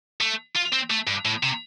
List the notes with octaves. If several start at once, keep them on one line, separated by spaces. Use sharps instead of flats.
A3
F4
C4
A3
G2
A2
C3